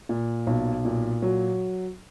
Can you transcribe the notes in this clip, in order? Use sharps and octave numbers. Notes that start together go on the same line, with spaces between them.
A#2
B1
A#2
F#3